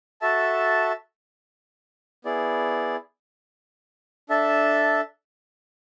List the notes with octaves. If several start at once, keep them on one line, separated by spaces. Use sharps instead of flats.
F#4 A4 E5 A5
B3 E4 G#4 D5
D4 A4 E5 A5